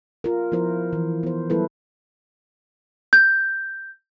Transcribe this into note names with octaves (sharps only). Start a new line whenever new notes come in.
F4 A#4
F3 B3 E4 A#4 C5
E3
B3 C5
F#3 G3 B3 E4 A4 B4
G6